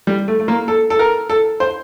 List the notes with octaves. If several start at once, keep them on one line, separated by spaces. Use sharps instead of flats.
G3
A3
A3
A#3
A4
A4
A#4
A4
C5